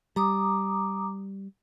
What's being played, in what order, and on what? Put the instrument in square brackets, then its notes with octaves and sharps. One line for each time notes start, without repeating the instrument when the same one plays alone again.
[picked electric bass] G3 [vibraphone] A#5 D6 D#6